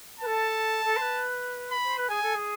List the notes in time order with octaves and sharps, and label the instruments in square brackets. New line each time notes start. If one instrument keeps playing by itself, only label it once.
[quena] B4 [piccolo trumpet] A5
[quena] A4
A4
C5
B4
[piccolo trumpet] B5
[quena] C5
B4
[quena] G#4 [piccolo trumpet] G#5
[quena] A4
G#4